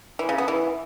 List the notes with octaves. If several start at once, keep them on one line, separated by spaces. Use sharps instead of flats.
E3
C#3
B3
E3